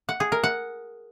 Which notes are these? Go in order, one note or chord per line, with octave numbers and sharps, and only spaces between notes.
F#5
G#4
A#4
F#5